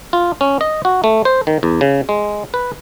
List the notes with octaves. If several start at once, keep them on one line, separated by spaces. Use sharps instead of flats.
F4
C#4
D#5
F#4
A3
C5
D#3
E2
C#3
G#3
B4